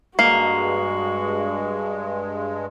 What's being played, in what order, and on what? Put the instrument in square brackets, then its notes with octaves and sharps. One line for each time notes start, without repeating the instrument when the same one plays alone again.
[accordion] G2 G#3 [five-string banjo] A#3 [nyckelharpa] F#4 [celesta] C7